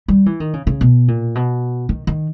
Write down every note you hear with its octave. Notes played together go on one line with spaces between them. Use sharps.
G3
E3
D#3
C#3
C#3
B2
A#2
B2
D#3
D#3